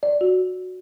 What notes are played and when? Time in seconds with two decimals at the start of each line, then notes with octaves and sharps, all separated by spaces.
0.03 D5
0.21 F#4